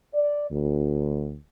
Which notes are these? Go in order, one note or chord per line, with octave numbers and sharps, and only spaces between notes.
D5
D2